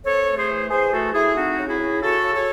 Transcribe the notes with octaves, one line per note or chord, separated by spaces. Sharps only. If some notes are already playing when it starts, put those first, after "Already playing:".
C4 A4 C#5
A3
G#4 C5
E3
E3 G#4 C5
A3 F#4 A4
A3 E4 G#4
C4 D#4 F#4
C#3
E4 G#4
C#3
C#3 F#4 A4
C#3
A4 C#5